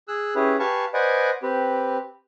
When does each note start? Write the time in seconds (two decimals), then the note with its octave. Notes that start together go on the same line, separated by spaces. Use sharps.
0.08 G#4 E6 F#6
0.35 C#4 E4 G4 G#4 B4
0.59 G4 B4 F5 G#5 A5 C#6
0.94 B4 C5 D5 D#5 F#5 G#5
1.43 C4 G4 B4